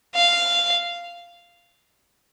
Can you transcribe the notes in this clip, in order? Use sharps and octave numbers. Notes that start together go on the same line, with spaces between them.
F5